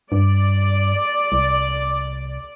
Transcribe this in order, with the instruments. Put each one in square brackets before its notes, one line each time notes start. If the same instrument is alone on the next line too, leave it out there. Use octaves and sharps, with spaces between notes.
[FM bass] G2 [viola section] D5
[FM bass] C2